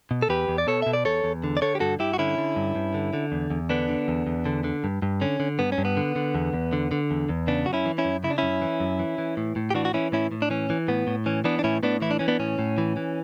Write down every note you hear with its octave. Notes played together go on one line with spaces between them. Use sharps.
B2
A4
E2 G4 B4
E2
D5
B2 A4 C#5
B2 E5
D5
E2 A4 C#5
E2
D3
D5
D3 A4 C#5
G4
G2 F#4 A4
G2 E4 G4
F#4
D3 C#4 E4
D3
G2
G2
D3
D3
E2
E2
D3 B3 D4
D3
E2
E2
D3
D3
G2
G2
D3 C#4
D3
G2 B3
C#4
G2
B3
D3
D3
E2
E2
D3
D3
E2
E2
C#3 B3 D4
F#2 F#4
C#4 E4
E3
C#4 E4
F#2
C#3 E4
D4
F#2 C#4 E4
E3
F#2
E3
E3
A2
A2
G4
E3 D4 F#4
F#4
E3 C#4 E4
A2 C#4 E4
A2
D4
E3 C#4
E3
A2 B3
A2
E3 C#4
E3 B3 D4
D4
A2 C#4 E4
A2 B3 D4
E3 E4
D4
E3 C#4
B3 D4
A2 C#4
A2
E3
E3